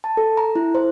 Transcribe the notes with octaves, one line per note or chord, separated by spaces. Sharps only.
A5
A4
A#5
E4
C5